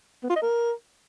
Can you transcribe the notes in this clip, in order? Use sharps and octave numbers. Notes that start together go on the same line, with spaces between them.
B3
F4
D#5
A#4